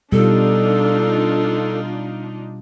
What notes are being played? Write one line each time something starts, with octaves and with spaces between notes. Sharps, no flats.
B2 G3 D4 D#4 F4 A4